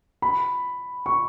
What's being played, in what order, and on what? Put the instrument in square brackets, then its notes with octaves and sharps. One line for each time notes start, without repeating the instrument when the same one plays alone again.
[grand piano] B5
C#6